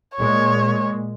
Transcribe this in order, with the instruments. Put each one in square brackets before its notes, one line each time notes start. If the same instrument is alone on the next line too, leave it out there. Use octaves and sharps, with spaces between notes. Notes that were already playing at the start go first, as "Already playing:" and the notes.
[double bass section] A#2 G#3 [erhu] C#5